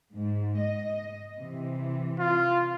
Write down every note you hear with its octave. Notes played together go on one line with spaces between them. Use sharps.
G#2
D#5
C3 E3
F4